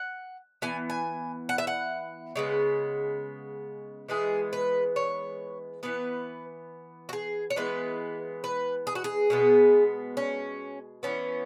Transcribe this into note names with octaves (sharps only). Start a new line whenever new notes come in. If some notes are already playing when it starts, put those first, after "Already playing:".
Already playing: F#5
E3 B3 G#5
G#5
F#5
E5
F#5
C#3 G#3 B3
E3 G#3 B3 G#4
B4
C#5
E3 B3 B4
F#4
G#4
C#5
E3 G#3 B3 B4
B4
G#4
F#4
G#4
B2 G#3 B3
C#4
E3 B3 C#4